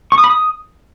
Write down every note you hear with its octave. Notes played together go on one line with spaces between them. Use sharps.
C#6
D#6
B5
D#6